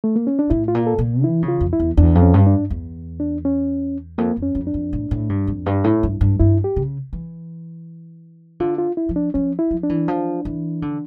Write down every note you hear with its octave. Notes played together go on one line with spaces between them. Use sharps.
A3
A#3
C#4
D4
A2 E4
F4
A#2
A4
A#2
E3 E4
C#3
F4
F2
E4
E2
E2 D4
F2
C#4
G2
D4
E2
D4
C#4
F2 A#3
F2
C#4
F2
D4
F2
A2
A2
G2
F2
G2
A2
G2
G2
G2 E4
G4
C#3
E3
D3 F4
F4
E4
F3
D4
F3 C#4
E4
F3
D4
E3
F3
E3
D3